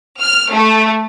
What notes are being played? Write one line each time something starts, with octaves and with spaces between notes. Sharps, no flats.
F6
A3